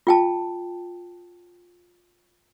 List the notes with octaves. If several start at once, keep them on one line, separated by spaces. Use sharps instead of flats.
F4 G5 A5